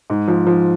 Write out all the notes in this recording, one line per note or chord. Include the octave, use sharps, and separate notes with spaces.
G#2
F3
F3